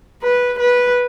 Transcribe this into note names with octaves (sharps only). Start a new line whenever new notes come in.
B4
B4